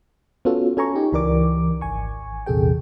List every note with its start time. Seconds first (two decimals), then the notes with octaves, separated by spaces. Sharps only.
0.45 B3 C#4 F4 F#4 A4
0.77 C#4 A4 G#5 A#5 C#6
0.95 D#4 G4
1.13 C#2 E3 A#4 D5 D6
1.81 G#1 G#5 C#6
2.46 A#1 E2 C3 G#4 A4 G5